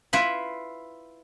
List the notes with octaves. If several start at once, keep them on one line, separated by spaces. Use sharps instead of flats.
E4 F4 B4